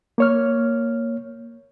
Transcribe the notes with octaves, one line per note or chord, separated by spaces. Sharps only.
A#3 C#5 F6